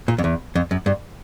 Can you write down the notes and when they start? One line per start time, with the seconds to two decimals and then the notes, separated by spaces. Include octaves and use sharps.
0.08 A#2
0.18 F2
0.24 E2
0.55 F2
0.71 F#2
0.86 G2